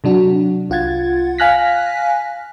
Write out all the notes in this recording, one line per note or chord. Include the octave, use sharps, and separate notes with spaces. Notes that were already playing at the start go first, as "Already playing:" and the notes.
C3 F#3 D4 F#4
C2 F4 F#5 G#6 A6
F5 G#5 F6 F#6 A#6 B6